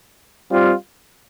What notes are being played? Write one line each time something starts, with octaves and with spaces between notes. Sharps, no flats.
G3 C4 F4